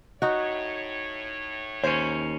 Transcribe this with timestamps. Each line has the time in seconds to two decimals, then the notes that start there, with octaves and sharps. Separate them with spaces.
0.22 A2 D#4 F#4 C#5
1.84 D#2 C#4 C5